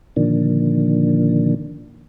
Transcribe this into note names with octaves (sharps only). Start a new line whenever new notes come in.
A#2 D3 D#3 F3 A#3 D4